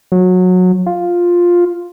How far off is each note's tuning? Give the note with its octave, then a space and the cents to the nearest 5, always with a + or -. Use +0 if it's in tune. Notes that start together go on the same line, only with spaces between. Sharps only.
F#3 -20
F4 +5